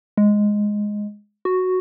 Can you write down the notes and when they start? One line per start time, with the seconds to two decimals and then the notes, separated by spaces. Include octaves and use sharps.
0.18 G#3
1.45 F#4